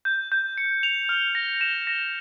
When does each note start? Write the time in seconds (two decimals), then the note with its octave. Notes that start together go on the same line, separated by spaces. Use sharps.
0.05 G6
0.32 G6
0.57 C#7
0.83 F7
1.09 F6
1.35 A#6
1.61 E7
1.87 A#6